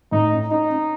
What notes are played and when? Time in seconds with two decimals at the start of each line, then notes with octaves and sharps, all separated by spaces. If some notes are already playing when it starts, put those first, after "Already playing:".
0.12 A2 D#4
0.32 C#4
0.50 C#4 D#4
0.70 C#4